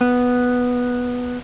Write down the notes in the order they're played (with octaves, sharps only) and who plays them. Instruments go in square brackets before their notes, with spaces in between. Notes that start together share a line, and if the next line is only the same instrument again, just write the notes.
[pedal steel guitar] B3